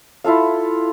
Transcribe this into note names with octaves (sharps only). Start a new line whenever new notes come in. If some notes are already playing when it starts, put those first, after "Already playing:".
E4 F4 A4 F5